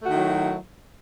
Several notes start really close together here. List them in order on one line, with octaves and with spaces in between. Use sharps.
A3 F#4 D#3 E4 F#3